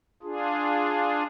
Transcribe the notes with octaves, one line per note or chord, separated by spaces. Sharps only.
D4 F4 G#4